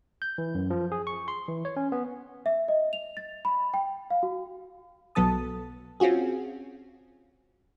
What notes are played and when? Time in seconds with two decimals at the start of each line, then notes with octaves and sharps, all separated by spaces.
0.22 G6
0.38 E3
0.55 F#2
0.70 F3
0.92 G#4
1.07 C#6
1.28 C6
1.48 E3
1.65 C#5
1.77 C#4
1.92 B3
2.46 E5
2.68 D#5
2.93 F7
3.17 A6
3.45 B5
3.74 G5
4.10 F5
4.23 F#4
5.15 B1 F#3 B3 A4 A5 D#6
6.00 C4 C#4 F4 F#4 G#4